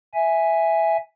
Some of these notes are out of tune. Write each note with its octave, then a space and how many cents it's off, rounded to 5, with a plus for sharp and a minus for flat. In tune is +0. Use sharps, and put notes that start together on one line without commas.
E5 +0 G#5 +0